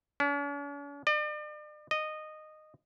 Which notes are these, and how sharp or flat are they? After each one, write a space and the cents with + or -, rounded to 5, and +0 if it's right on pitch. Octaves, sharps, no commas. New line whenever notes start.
C#4 +45
D5 +40
D#5 -15